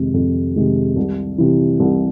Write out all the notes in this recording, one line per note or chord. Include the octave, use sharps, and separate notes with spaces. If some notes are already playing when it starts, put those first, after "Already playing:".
Already playing: F2 C3 D#3 G#3
F2
C3 D#3 G#3
C2
C3 E3
C2